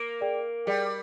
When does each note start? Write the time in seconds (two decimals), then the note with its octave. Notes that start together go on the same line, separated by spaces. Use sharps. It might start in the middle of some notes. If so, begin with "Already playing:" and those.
Already playing: A#3
0.21 G#4 D5 G5
0.67 G3 G#4 D5 G5